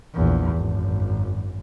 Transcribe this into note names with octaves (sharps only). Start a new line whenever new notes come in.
A#1 E2
G#1 F#2